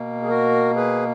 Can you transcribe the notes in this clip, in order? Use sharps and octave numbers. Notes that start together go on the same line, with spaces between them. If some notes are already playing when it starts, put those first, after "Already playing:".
Already playing: B2 A#3
G#4
F#4 A#4
G#4 B4